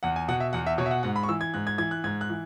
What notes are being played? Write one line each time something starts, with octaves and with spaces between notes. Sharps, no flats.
E2 F#5
G#5
B2 F#5
E5
E2 F#5
E5
B2 C#5
E5
F#5
G#2 F#5
B5
C#6
E3 E6
G#6
G#2 F#6
G#6
E3 G#6
F#6
G#2 G#6
F#6
E3